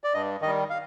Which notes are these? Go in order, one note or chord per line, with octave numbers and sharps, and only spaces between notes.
D5
G2 D#5
D#3 G3 D#5
F5